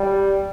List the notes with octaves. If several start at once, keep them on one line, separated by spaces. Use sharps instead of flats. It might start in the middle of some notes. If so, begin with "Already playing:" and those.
Already playing: G3